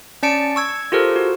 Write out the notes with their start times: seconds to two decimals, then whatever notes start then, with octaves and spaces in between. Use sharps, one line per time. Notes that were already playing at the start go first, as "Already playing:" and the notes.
0.23 C#4 D5 A5 C#7 D7
0.56 C#6 E6 G#6
0.92 F4 G4 A4 A#4 C5
1.16 F#4